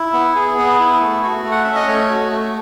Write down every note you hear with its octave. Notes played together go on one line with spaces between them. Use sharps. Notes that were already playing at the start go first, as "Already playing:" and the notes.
Already playing: E4
B3
G#4
B3
E4
A3
F#4
A3
F#5
C#4 E5
D#5
A3 C#5
F#4
A3